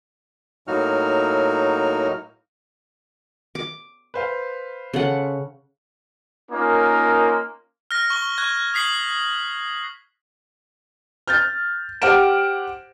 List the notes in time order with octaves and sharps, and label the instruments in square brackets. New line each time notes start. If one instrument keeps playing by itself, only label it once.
[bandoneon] A2 F#3 A#3 D#4 F#4 F6
[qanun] D6
[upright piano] B4 C5 F5
[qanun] C#3 A4 F#5
[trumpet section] A#3 C#4 D#4 F4 A#4
[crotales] F6 F#6 A#6
C#6 G7
C#6 F#6 G#6
D#6 B6 C7 F#7
[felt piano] F6 G6 A6
G4 C5 F#5 F6 D7 E7